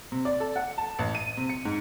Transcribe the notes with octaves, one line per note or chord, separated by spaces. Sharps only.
C3
D5
A4
F#5
A5
A1
D#7
C3
C#7
G#2